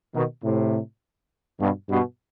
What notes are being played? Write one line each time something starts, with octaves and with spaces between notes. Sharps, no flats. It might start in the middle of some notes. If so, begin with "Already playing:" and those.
B2 D#3
A2 C3
G2 B2
G2 B2